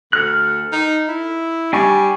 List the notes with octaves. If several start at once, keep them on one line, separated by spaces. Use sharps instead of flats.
D2 A4 F6 F#6
D#4
E4
G3 D4 G#5 C#6